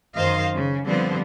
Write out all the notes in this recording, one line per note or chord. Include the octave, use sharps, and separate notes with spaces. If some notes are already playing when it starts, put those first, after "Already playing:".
F#2 D#3 C5 D#5 F5
C#3
D3 F3 G3 B3 C4